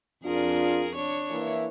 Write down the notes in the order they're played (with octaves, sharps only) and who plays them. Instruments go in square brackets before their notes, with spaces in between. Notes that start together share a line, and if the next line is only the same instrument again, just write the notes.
[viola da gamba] F2 G#4 A#4 [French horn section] D4 F4
[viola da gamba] D4 C#5
[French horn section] E3 A#3 E4